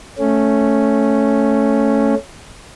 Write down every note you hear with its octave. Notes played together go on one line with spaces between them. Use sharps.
A3 C#4